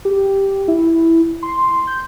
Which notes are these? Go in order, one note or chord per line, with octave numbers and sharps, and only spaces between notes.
G4
E4
C6
G6